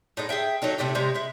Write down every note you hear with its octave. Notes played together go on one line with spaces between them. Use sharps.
A2 G#3 D#4
G#4 A#4 E5 G5
F#3 A3 D#4 A4
A2 C3 A3 G4
C3 G3 G#3 D#4
G#3 E4